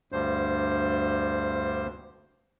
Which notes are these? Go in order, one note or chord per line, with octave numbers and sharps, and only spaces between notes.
D2 G2 C5